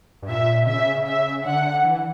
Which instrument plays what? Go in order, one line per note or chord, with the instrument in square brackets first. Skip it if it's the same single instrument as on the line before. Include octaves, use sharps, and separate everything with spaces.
[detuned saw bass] G2
[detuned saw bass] A#2 [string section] E5
[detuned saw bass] C#3 [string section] E5
[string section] E5
[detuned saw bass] D3 [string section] F#5
[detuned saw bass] E3